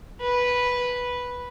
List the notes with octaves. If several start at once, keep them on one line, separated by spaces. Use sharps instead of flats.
B4